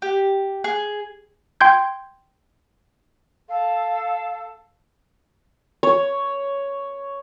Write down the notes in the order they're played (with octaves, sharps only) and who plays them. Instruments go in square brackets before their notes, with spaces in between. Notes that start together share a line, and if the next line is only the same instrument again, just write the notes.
[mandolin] G4
G#4
[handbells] G5 C6 G6 G#6
[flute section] A4 F5
[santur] C#5